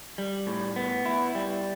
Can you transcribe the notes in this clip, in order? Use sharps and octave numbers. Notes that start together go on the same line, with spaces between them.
G3
A2
B3
E4
G3